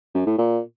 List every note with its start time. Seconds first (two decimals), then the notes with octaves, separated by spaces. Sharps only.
0.14 F#2
0.26 A2
0.38 A#2